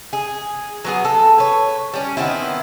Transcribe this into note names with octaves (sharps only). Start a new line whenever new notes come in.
G#4
F#3 B3 G#4
A4
B4 C#5
G3 C#4
D#3 B3 C4 E4